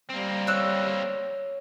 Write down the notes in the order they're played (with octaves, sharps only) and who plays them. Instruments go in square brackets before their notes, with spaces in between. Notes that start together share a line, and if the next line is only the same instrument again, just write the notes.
[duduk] G3 [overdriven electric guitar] A#3 C4
[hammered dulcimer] C#5 [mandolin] E6 F#6